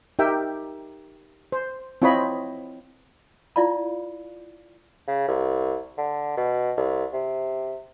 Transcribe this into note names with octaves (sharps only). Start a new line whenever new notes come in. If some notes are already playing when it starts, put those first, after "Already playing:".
D#4 G4 A#4 E5 G5
C5
C4 E4 F4 C#5 D#5 B5
E4 F4 D5 F5 B5
C#3
C2
D3
B2
C2
C3